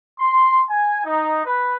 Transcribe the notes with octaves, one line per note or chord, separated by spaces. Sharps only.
C6
G#5
D#4
B4